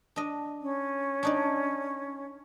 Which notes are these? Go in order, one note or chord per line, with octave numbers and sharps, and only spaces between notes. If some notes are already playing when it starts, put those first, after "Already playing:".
D4 D#5
C#4
D4 D#4 D5